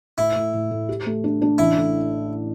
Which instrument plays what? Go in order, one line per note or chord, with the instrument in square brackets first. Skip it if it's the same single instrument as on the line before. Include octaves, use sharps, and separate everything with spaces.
[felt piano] A2 [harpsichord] E4
[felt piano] A2
A2
A2
G4
A3
D4
D4
[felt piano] A1 [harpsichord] E4
[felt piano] A2